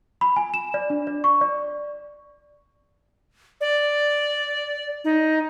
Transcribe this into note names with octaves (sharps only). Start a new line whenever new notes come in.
B5
G#5
E7
D5
D4
D5
C#6
D5
D5
D#4